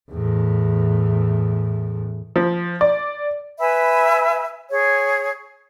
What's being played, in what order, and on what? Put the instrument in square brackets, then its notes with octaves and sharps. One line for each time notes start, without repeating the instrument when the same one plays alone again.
[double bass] E2 A2
[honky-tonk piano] F3
D5
[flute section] B4 E5 G#5 B5
G#4 C#5